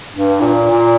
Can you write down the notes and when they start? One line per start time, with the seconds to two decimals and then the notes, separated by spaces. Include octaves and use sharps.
0.13 G2
0.41 A#2
0.70 A#2